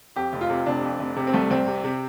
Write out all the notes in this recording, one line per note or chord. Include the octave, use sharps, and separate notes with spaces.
F2 G4
F1
F4
C3
F1 D4
F2
F1
C3
C4
C2 A3
C2 C4
C3
C3